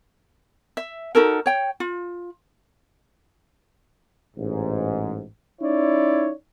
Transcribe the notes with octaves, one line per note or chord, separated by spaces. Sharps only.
E5
D#4 F#4 A4 A#4
C#5 G5
F4
A1 G#2
C#4 D#4 E4 C#5 D5